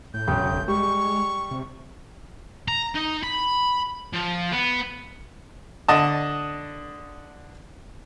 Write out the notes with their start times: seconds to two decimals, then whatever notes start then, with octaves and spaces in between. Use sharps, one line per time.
0.14 A2 G6
0.27 E1 C#3 F#3 G5
0.53 G#1
0.68 G3 G#3 C#6
1.51 C3
2.68 A#5
2.95 D#4
3.23 B5
4.13 F3
4.52 B3
5.88 D3 D#5 A5